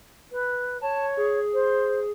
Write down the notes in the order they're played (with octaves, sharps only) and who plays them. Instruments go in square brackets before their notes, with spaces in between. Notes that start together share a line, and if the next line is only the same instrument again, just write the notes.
[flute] B4
[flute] C#5 [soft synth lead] A5
[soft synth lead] G#4
[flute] C5